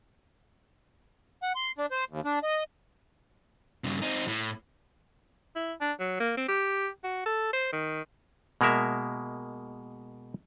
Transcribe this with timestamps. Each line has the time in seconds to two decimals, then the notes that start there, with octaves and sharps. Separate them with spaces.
1.43 F#5
1.55 C6
1.78 D4
1.91 C5
2.10 D#2
2.25 D4
2.43 D#5
3.84 G2 C#3
4.02 C4 D#4
4.28 A2
5.56 E4
5.81 D4
6.00 F#3
6.20 A#3
6.37 C4
6.49 G4
7.04 F#4
7.26 A4
7.53 C5
7.73 D#3
8.61 B2 G#3 A#3 A#4 E5